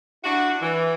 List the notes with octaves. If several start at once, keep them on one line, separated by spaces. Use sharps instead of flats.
D4 E4 F#4
E3